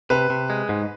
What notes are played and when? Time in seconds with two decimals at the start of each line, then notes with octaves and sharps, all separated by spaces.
0.10 C3 B4
0.30 C3
0.50 G#3
0.69 G#2